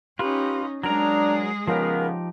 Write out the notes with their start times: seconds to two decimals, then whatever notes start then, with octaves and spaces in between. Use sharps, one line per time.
0.19 C#4 D#4 F4 G4 B4
0.84 F#3 G#3 D4 G#4 A#4 A#5
1.67 C#3 F3 B3 D#4 G4 A#4